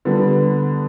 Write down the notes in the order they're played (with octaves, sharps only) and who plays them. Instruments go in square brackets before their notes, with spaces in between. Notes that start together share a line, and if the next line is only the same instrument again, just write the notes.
[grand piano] D3 G3 B3